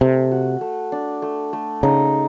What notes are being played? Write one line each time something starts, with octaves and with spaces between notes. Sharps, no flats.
C3 A3
F#4
A3
D4
A3
A3
C#3 D#4